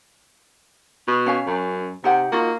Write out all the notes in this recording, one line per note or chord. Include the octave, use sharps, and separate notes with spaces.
B2
C#4 F5 G#5
F#2
C3 D#4 G4 F#5
A#3 D#4 F4 F#4